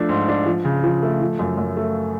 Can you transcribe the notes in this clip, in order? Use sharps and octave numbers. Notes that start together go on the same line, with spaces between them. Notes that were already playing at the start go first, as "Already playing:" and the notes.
Already playing: F3 A3 D4
G#2
D4
F3
C#3
F3
A3
F3
F#2
F#2
A3